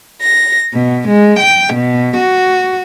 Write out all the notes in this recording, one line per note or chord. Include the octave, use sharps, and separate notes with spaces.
A#6
B2
G#3
G5
B2
F#4